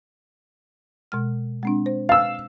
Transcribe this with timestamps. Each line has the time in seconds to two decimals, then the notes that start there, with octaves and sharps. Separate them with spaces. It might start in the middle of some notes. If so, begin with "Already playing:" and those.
1.12 B2 G#3 F6
1.63 G#3 C4 D4
1.86 C5
2.09 F5 E6 A6